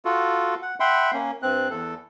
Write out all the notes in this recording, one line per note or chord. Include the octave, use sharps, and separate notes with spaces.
F4 F#4 A4
F#5
E5 F#5 G5 B5 C6
A#3 C#4
G2 C4 F#6
E2 A4